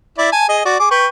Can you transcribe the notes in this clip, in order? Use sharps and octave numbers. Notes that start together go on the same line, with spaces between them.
E4 D5
G#5 A5
G#4 D#5
F#4 D5
G#4 D6
B4 G5 C#6